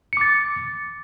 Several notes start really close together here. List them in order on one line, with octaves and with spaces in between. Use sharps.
C#7 D6 A6